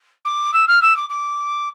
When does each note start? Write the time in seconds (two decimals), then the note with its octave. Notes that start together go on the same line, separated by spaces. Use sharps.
0.25 D6
0.53 E6
0.67 F6
0.81 E6
0.96 D6
1.09 D6